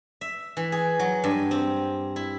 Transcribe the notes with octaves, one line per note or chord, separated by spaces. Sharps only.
E5
E3
G#4
F#3
G2
C4
E4